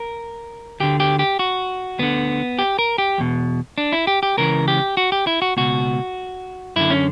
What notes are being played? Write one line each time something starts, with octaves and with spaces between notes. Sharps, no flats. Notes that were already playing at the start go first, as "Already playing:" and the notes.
Already playing: A#4
D2 D3 G4
G4
G4
F#4
D2 D3 B3
G4
A#4
G4
E2 B2
D4
E4
G4
G4
C#2 C#3 E3 A#4
G4
F#4
G4
E4
F#4
C#2 B2 F#4
F#2 D3 E4
C#4